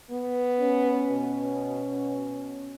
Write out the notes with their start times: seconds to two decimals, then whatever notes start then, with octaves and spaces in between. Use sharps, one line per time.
0.11 B3
0.61 C#4
1.11 B2